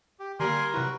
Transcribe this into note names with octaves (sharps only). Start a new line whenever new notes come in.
G4
D3 G3 A#3 A#4 G#5 C6
C3 F#3 E4 F#4 B4